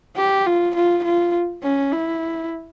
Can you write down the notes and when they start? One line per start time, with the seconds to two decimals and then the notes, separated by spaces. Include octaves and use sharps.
0.17 G4
0.46 F4
0.75 F4
1.04 F4
1.63 C#4
1.92 E4